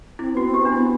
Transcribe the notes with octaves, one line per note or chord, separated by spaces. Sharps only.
C4 E4
B3 F#4
C4
G4
B3
D4
B3 E4